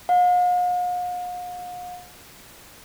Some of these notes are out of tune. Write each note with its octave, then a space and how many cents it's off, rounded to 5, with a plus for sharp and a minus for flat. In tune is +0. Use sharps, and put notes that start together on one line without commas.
F5 +45